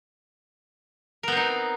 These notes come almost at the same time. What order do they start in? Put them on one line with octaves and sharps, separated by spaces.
A#4 B3 C4 D#4